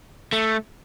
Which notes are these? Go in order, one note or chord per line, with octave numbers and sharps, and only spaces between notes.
A3